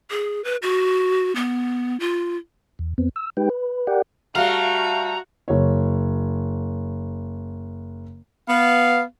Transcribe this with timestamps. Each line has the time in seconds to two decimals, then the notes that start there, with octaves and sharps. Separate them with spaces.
0.11 G#4
0.44 B4
0.62 F#4
1.36 B3
2.00 F4
2.79 E2
2.98 F2 B3 C4
3.16 E6
3.37 G#3 D#4 G4 B4 G5
3.50 B4
3.87 G4 A#4 D5 F#5 G5
4.35 G3 A3 F#4 F5 A#5
5.48 F#1 C#5
8.48 B3 F5